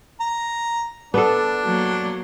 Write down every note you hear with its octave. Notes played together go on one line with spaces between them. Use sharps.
A#5
B3 D4 A4
F#3 A#3